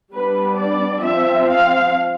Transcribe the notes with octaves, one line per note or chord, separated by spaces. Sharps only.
G3 B3 D4 B4
D5
F3 C4 E5
F5